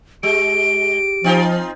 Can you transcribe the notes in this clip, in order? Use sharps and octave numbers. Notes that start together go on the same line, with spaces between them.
G#3 G4 D7
F3 C4 D#4 F4